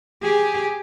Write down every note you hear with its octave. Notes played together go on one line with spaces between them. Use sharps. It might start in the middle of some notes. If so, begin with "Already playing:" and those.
G4 G#4